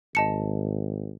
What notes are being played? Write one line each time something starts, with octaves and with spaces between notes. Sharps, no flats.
G#1 D#5 A5 C#7